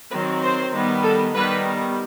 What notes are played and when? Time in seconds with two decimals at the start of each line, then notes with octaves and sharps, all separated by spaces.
0.12 D#3 F#3 C4 B4
0.42 C5
0.72 D#3 G3 B3
1.03 A4
1.34 D#3 G3 B3 B4